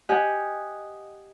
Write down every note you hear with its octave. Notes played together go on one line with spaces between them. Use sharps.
G4 D#5 F#5 G#5